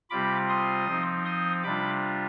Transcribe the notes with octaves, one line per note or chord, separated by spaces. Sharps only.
C3 G3 C4 F4 B5 D6
C6 D#6
F3 C4 D#4
C6 D#6
C3 G3 D4 F4 B5 D6